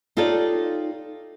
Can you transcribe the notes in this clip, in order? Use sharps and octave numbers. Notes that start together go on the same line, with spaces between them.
D#4 F4 G4 A4 C#5 D5